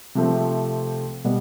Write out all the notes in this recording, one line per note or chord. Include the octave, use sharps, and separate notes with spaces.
C3 F3 A3 C4
B2 G3 B3